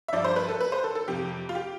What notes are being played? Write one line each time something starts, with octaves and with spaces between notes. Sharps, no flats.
E5
G2 F3 D5
C5
B4
A4
B4
C5
A4
A4
F2 C3 F3 G4
F4
G4